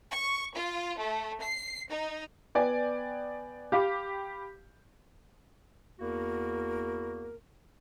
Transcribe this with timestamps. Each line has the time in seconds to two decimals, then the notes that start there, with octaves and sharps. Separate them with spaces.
0.11 C#6
0.54 F4
0.98 A3
1.42 C7
1.89 D#4
2.55 B3 B4 D5 G5 G#5
3.72 G4 F5 B5 D6
6.00 E2 A#3 E4 F#4 A#4